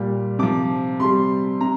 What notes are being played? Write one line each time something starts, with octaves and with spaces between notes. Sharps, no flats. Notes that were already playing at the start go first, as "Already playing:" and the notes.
Already playing: A#2 G3
C3 F3 D6
C3 G3 C6
C3 A#5